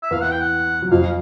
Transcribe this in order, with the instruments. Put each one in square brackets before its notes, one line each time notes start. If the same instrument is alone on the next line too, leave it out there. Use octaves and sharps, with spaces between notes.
[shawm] E5
[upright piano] E2 E3 [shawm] F5
[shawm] F#5
G5
F#5
[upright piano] F#3
[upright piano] F2 F3 [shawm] F5